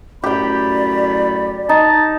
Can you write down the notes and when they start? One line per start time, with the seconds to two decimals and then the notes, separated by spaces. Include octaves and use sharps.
0.24 F#2 A2 G4 D5 G5 B5
1.69 D#4 A5